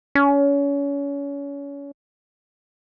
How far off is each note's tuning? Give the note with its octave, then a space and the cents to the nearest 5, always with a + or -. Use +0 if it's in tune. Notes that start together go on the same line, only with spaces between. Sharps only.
C#4 +30